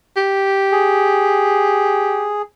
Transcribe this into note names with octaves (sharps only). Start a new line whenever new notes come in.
G4
G#4